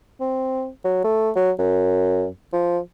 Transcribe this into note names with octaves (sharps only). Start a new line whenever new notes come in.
C4
F#3
A3
F#3
F#2
F3